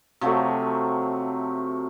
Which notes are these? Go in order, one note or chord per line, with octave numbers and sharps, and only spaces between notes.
C3 F3 F#3 A3